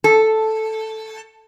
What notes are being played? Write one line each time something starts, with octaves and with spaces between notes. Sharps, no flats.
A4